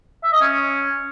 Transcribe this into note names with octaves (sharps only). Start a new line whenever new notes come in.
E5
D#5
C#4